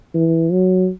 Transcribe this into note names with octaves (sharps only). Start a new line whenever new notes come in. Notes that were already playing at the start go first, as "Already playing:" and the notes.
E3
F#3